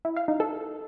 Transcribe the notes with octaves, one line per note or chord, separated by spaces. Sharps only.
E4
F5
D#4
A4